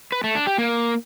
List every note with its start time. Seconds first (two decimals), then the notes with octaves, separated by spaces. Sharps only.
0.12 B4
0.24 A3
0.35 D4
0.47 G4
0.58 A#3